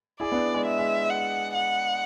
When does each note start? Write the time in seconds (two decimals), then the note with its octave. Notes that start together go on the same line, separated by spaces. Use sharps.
0.20 E4 G#4 D5
0.32 B3 D4
0.54 G#3
0.66 E5
0.79 G#3
1.10 F#5
1.54 F#5